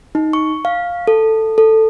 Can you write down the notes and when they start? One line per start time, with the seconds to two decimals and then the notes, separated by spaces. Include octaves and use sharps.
0.15 D#4
0.33 C#6
0.65 F5
1.07 A4
1.58 A4